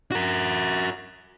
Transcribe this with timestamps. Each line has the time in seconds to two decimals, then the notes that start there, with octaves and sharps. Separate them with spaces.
0.12 F#4 A#4